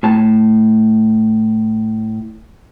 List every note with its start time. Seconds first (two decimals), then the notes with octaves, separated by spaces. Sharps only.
0.03 A2 A5